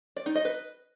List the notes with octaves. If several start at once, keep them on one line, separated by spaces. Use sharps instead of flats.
D5
D#4
D#5
B4